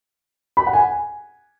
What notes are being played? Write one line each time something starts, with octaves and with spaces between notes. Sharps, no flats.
B5
F#5
G#5